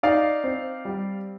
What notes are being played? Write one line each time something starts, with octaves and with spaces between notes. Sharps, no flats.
D#4 D5 F5
C4
G3